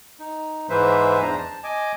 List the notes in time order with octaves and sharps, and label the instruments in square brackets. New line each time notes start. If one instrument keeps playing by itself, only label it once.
[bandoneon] D#4
G#2 E3 G#3 B4 C5 E5
E2 D4 C5 A#5
A5
D#5 G#5 D6